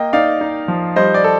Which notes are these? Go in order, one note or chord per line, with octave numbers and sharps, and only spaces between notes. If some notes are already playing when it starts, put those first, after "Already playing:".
Already playing: A#3 D#5 G5
D#4 D5 F5
D#4
F3
G3 C5 D#5
D5
A4